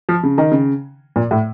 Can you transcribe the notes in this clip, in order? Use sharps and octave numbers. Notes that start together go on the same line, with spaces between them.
F3
C#3
D#3
C#3
A#2
A2